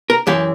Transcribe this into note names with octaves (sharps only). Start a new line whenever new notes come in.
A#4
F#2 E3 G4